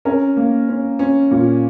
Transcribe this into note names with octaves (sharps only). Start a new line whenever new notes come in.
C#4 A#4
A#3
C#4
C#4
A#2